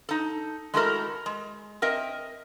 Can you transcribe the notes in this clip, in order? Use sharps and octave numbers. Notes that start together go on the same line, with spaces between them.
D#4 A4
G#3 A3 E4 F#4 A4 A#4
G#3
C4 A#4 D#5 E5